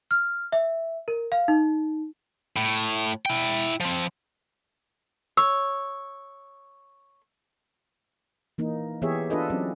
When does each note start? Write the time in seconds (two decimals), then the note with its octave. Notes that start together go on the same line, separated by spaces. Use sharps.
0.11 F6
0.52 E5
1.08 A#4
1.32 F5
1.48 D#4
2.56 A2
3.26 E4 G5
3.80 F3 C4
5.37 C#5 E6
8.58 E3 A#3 D#4
9.02 E3 B3 G4 G#4 C#5 E5
9.30 D4 F4 A4 B4 D#5 E5
9.50 F#3 C4 C#4